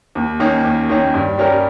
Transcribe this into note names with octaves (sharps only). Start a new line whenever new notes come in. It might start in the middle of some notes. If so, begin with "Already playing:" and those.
D#2
D#3 A#3 C#4
D#2
D#3 A#3 C#4
G2
G3 C#4 G4 A#4